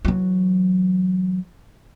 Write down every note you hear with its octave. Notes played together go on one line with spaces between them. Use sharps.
E3 F#3